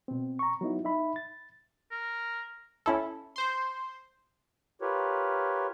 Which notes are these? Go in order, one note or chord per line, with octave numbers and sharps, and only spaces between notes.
B2 C4
A#5 C#6
F#3 B3 D#4 E4
D#4 E5 B5
A6
A#4
C#4 E4 A4
C5 C6
F4 G4 A#4 B4 C#5